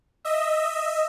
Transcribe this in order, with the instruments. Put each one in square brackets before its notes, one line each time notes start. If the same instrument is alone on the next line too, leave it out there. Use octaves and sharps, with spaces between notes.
[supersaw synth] D#5 E5